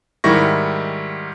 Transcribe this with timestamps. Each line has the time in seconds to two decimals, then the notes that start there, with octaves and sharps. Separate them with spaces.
0.24 G#2 D#3 G3 E4 C#6 A#6